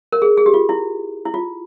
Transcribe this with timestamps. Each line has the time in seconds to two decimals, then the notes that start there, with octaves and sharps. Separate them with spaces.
0.12 A#4
0.22 G#4
0.37 G#4
0.46 G4
0.54 F4
0.69 E4
1.25 E4
1.34 F4